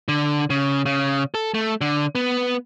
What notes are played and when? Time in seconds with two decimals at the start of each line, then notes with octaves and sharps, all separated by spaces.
0.08 D3
0.50 C#3
0.86 C#3
1.34 A4
1.54 A3
1.81 D3
2.15 B3